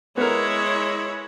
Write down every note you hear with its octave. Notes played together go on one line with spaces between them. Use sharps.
G#3 B3 E4 A#4 C#5